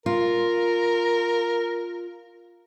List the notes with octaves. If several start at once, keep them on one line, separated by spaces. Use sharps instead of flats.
F4 A#4